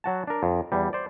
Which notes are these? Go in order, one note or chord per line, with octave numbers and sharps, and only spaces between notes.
F#3 F#4 A5
D4 A#4
F2
E2 G3
C5 D5